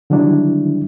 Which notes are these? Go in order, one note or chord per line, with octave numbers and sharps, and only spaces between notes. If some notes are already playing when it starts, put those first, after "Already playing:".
D3 D#3 F#3 G3 D4 E4